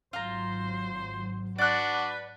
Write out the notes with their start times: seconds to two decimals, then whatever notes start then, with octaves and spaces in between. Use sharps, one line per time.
0.13 G#1 F#3 F4 C5 A#5
1.58 D4 F#4 B4 D5 F#6